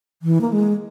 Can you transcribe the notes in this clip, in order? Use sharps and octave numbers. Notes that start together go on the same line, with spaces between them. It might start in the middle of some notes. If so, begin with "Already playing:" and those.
E3
A#3
G#3